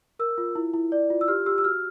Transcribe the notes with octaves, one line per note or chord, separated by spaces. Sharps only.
A#4 E6
F4
E4
E4
D5
F4
E6
G4 F6
G4 E6
E6
F#4 F6